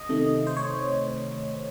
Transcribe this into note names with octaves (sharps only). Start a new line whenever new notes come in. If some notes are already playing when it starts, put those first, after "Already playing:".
Already playing: D#5
C3 D#3 A3
C5
C#5